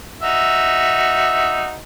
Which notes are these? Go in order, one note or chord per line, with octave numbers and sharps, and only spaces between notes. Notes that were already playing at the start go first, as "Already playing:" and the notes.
D#4 F#4 E5